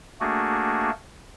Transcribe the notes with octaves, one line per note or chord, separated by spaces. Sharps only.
A3 A#3 D4 F#4 G#4